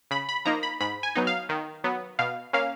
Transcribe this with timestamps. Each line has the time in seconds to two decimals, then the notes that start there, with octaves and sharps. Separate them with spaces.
0.11 C#3 B5
0.29 B5
0.45 F3 A#3 D#4 A#5
0.63 B5
0.81 G#2 B5
1.03 G#5
1.15 F#3 B3 D#4
1.27 F5
1.49 D#3
1.84 F#3 B3
2.19 B2 F5
2.53 A#3 C#4 F5